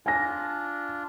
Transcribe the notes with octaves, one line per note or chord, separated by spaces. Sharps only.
D4 F4 G#5 A#6